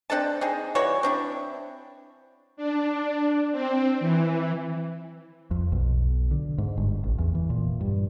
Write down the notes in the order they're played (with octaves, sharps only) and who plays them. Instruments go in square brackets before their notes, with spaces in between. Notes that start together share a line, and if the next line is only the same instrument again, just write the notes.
[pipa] C4 D4 A4 A5
C4 D#4 G#4
E3 G3 F#4 C#5
C4 D4 E4
[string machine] D4
C4
E3
[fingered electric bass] F2
B1
D3
G#2
G1
A1
E2
E3
A#2
G2